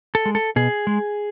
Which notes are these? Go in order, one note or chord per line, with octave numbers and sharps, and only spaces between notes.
A4
G#3
A4
B2 G#4
G#3